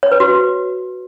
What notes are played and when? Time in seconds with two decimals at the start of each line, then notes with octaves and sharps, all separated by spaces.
0.03 C#5
0.12 B4
0.20 F#4